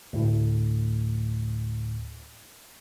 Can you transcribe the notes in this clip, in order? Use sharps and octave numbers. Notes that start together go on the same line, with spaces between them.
D2 A2